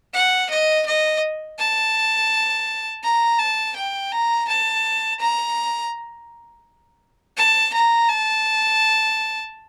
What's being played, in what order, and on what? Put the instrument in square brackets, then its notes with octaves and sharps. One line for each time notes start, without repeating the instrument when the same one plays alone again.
[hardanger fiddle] F#5
D#5
D#5
A5
A#5
A5
G5
A#5
A5
A#5
A5
A#5
A5